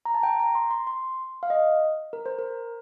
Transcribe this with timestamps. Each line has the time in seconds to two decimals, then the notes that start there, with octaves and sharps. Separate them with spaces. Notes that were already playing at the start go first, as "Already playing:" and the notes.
0.05 A#5
0.15 A5
0.23 G5
0.40 A#5
0.55 C6
0.71 C6
0.87 C6
1.43 F5
1.50 D#5
2.13 A#4
2.26 C5
2.39 A#4